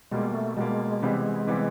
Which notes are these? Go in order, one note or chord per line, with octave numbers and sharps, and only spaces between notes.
B2 G3 G#3 A#3
A3
B2 G3 G#3 A#3
C3 E3 G3 B3
C3 E3 G3 B3